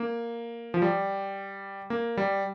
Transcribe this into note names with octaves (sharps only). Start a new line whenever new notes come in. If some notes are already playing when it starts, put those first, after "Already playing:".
Already playing: A#3
F3
G3
A#3
G3